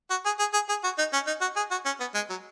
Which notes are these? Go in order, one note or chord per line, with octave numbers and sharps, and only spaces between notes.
F#4
G#4
G#4
G#4
G#4
F#4
D#4
C#4
D#4
F#4
G#4
F#4
C#4
B3
G#3
F#3